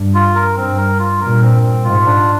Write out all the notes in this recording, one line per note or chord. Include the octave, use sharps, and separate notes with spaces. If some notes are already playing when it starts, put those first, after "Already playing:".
Already playing: G2
F4
A#4
G2 C4
A#4
F4
G2 A#2 A#4
C4
C4
G#2 C3 F4
D4